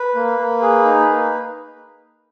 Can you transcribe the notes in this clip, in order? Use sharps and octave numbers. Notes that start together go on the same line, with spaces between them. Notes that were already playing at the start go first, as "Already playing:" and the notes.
Already playing: B4
A#3
A#3
G#4
D#4
A#3